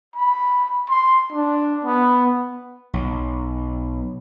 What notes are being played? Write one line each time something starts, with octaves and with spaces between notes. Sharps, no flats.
B5
C6
D4
B3
B1